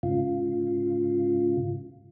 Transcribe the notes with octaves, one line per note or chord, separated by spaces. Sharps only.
G#2 C#3 F4